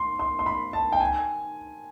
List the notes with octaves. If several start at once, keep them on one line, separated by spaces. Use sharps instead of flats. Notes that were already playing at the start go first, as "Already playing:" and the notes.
Already playing: C6
C6
C6
B5
A5
G5
G#5